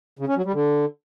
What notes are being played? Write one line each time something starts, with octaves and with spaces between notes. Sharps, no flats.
C#3
C#4
F#3
G3
D3